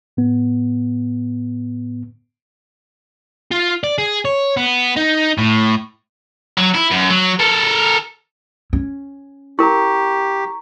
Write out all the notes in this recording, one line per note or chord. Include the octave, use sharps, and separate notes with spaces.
A2 B3
F4
D5
G#4
C#5
B3
D#4
A2
F#3
E4
F#2
F#3
A4 A#4
C#4
E4 G4 A#4 A#5 C#6